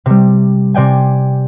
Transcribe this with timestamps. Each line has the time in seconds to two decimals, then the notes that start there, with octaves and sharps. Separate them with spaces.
0.06 C3 G3
0.74 C3 D5 G5 G#5